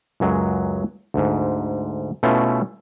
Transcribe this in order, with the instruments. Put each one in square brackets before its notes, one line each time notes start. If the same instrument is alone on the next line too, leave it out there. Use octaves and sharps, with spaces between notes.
[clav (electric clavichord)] C#2 F#2 F#3 G#3
D2 G#2
B2 A3 C#4 E4 F4